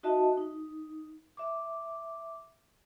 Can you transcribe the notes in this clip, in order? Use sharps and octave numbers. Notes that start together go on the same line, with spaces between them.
D#4 F#4 D#5 E5 A5
D#4
E5 D6